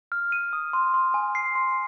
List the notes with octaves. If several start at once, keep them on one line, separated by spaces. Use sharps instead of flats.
F6
D#7
D#6
C6
C6
G#5
C7
C6